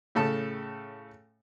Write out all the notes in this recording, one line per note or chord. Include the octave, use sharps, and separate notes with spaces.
A2 C#3 A4 A5